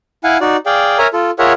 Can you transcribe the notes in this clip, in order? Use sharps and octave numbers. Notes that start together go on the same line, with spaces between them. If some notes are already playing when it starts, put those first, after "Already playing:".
E4 F5 F#5 G#5
D#4 F#4 D5
G#4 D5 F5 G5
A#4 C#5 E5 G#5 A#5
F4 A4
F4 G#4 A#4 C#5 E5 F#5